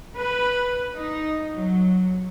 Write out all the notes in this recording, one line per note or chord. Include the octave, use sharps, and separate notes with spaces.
B4
D#4
F#3